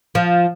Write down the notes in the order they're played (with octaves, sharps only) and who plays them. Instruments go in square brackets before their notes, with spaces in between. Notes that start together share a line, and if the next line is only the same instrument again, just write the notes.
[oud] F3